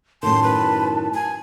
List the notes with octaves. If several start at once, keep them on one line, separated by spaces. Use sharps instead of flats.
F#2 A2 D#3 A5 C6
B4
G#5